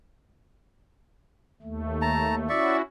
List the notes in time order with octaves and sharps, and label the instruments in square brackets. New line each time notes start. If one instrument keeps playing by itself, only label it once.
[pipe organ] D#2 A3
[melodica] A5 A#5
[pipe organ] C#4 E4 F#4 [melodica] D5 E5 C#6